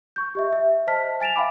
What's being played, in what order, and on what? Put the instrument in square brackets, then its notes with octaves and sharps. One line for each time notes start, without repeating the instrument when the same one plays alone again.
[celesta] C#6 G6
G4 D#5 E5
E5
C5 D#5 A5 F6 B6
G#5 A6 D7 E7 F7
E5 F5 G5 B5 D6